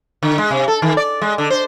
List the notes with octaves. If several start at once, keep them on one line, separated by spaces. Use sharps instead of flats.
D3
G#3
C3
A4
D#3
D5
G#3
D3
C5